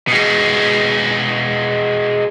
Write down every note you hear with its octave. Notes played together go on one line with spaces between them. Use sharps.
B2 G#3